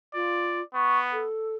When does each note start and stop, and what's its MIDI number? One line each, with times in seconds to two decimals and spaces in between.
0.14 0.61 65
0.14 0.63 74
0.74 1.25 59
0.74 0.98 85
1.12 1.55 69